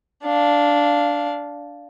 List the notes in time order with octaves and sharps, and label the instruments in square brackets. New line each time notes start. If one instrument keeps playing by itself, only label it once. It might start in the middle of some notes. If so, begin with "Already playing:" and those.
[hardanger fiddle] D4 F5